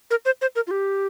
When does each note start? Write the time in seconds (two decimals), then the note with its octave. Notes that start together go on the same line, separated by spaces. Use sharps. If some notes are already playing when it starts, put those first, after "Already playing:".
0.11 A#4
0.25 C5
0.41 C5
0.56 A#4
0.67 F4
0.71 G4